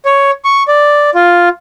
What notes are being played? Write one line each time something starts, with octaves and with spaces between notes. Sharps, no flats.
C#5
C#6
D5
F4